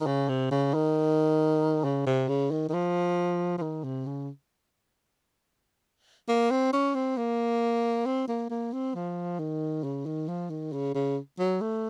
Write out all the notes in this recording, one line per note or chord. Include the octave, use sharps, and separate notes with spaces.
D#3
C#3
C3
C#3
D#3
C#3
C3
C#3
D#3
D#3
F3
F3
D#3
C3
C#3
A#3
C4
C#4
C4
A#3
C4
A#3
A#3
C4
F3
D#3
C#3
D#3
F3
D#3
C#3
C#3
F#3
A3